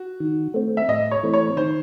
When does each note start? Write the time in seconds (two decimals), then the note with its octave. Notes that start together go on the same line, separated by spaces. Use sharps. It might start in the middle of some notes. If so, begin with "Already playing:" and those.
Already playing: F#4
0.20 D#3
0.54 A3 C4
0.77 E5
0.88 A2 D#5
1.11 C#5
1.23 E3 A3 C4
1.34 C#5
1.56 D#3 C5